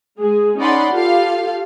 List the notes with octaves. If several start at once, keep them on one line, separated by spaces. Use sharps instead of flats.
G#3 G#4
C#4 D#4 D5 F#5 B5 C6
F4 G4 A4 F5